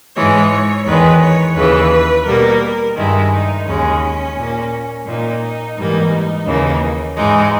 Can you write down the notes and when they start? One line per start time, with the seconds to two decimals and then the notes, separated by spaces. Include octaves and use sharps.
0.16 G#2 E3 G#3 C#5
0.86 E2 D#3 G#3 B4
1.22 C#5
1.56 D#2 C#3 E3 B4
2.26 B2 G3 A#3 A#4
2.96 G2 D#3 G#3 E4
3.31 D#4
3.66 D#2 C#3 G#3 C#4
4.36 A#2 A#3
5.06 A#2 A#3 D#4
5.41 D#4
5.76 G#2 E3 G3 A#3 D#4
6.47 D#2 C#3 E3 A#3
7.16 G#2 E3 G#3 D#4